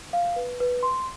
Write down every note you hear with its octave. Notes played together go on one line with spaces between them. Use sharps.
F5
B4
B4
C6